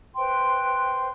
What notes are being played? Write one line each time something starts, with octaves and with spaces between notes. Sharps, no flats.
B4 C5 G5 C6